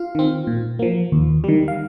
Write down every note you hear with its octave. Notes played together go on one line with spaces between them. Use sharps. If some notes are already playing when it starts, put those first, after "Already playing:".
Already playing: F4 F5
D#3 C4
A#2
F3 A#3
D#2
D#3 G3
F5